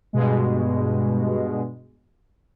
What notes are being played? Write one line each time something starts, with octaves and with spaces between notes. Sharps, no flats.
G2 B2 G#3